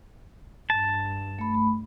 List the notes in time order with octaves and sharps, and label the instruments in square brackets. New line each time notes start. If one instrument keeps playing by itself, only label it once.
[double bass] G2 [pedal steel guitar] A5
[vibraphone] A3 B5